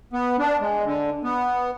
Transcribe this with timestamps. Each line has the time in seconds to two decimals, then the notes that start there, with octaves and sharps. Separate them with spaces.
0.13 B3
0.39 D4
0.61 G#3
0.85 D3
1.24 B3